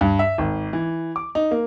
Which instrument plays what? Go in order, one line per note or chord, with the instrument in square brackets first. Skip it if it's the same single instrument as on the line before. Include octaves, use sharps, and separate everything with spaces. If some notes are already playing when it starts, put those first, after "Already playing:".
[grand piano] G2
E5
G#1
E3
D6
D#4
A#3